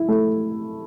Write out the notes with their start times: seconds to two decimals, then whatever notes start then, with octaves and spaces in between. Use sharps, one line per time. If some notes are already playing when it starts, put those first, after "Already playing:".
Already playing: E4
0.09 A3